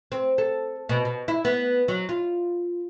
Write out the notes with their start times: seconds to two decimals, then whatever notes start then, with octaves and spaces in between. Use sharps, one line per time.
0.12 C4
0.38 A4
0.89 B2
1.05 B2
1.28 E4
1.45 B3
1.88 F#3
2.09 F4